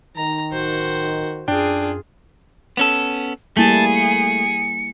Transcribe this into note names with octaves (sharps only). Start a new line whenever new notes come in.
D#3 A#5
D1 F#4 C5
F#2 D4 F4 G#4 G5
B3 C#4 A4
G3 A3 A#3 E4 G#4 A5
C#7